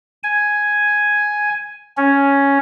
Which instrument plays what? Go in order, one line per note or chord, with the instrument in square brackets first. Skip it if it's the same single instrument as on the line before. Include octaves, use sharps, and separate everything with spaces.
[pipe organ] G#5
C#4